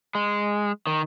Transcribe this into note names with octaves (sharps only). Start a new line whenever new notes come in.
G#3
D#3